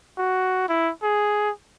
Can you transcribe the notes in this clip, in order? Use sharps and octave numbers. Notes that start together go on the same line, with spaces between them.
F#4
E4
G#4